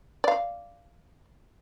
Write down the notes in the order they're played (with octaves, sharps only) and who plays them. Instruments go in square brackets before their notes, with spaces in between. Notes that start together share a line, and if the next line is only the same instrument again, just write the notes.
[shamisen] D5 F5